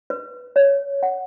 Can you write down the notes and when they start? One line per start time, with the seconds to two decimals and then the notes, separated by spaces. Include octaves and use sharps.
0.10 B4
0.56 C#5
1.03 F#5